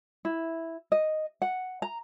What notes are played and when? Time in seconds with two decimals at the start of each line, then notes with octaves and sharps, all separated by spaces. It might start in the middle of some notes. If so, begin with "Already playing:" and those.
0.25 E4
0.92 D#5
1.42 F#5
1.82 A#5